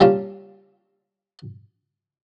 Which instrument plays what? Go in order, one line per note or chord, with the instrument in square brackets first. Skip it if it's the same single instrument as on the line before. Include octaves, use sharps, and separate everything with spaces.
[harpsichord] G3 A#3 C#4 D4 F4